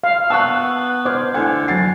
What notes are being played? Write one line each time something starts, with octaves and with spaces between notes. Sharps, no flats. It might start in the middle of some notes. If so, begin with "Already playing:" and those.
F5
B3 A5 C#6 E6 F#6
C5 D6 F6 G#6
D3 E4 F#5 G#5 G#6
F#3 A6 C7